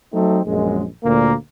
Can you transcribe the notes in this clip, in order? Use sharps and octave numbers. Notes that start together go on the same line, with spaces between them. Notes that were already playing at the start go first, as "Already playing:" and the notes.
F#3 A3 C4 D#4
A#1 F#2 G#3
D2 A#2 A#3